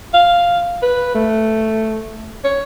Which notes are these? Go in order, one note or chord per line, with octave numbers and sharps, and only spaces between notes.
F5
B4
A3
C#5